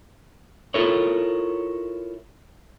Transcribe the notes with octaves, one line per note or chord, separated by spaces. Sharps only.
E4 F4 A4 A#4 C#5